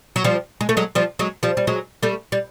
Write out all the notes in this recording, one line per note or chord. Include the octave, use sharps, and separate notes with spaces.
F#3
F3 G3
G#3
A3
F#3 G#3
F3 G3
F#3 G#3
F3 G3
G3
F#3 G#3
G3 A3
G3